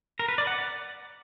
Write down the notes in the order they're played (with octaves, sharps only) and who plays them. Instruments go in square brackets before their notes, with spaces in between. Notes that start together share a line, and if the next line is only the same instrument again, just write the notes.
[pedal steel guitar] A#4
B4
D5
F#5